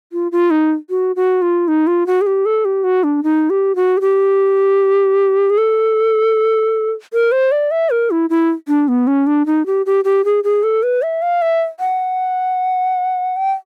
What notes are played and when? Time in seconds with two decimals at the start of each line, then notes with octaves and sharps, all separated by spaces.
0.12 F4
0.32 F4
0.51 D#4
0.90 F#4
1.16 F#4
1.42 F4
1.68 D#4
1.87 F4
2.07 F#4
2.21 G#4
2.26 G4
2.46 A4
2.65 G4
2.84 F#4
3.04 D4
3.23 D#4
3.50 G4
3.76 F#4
3.97 G#4
4.01 G4
5.50 G#4
5.58 A4
7.13 A#4
7.32 C5
7.52 D5
7.71 E5
7.90 A#4
8.11 E4
8.30 E4
8.68 D4
8.88 B3
9.07 C#4
9.27 D4
9.46 D#4
9.66 G4
9.86 G4
10.05 G4
10.25 G#4
10.44 G#4
10.63 A4
10.83 B4
11.02 E5
11.22 F5
11.42 E5
11.80 F#5
13.36 G5